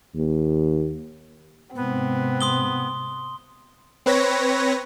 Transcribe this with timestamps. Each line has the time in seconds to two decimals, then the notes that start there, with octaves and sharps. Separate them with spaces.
0.15 D#2
1.76 G#2 C3 B3 C4
2.41 C6 D#6 G7
4.06 C4 B4 C#5 A#6